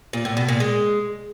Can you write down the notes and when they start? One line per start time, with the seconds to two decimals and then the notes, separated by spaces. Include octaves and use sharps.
0.13 A#2
0.25 A2
0.37 B2
0.48 A#2
0.60 G#3